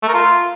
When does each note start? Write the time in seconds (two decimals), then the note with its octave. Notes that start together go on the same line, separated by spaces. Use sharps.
0.03 A3
0.08 A#4
0.14 F4